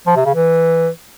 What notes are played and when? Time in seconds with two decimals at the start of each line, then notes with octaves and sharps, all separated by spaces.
0.07 F3
0.16 C3
0.25 C#3
0.35 E3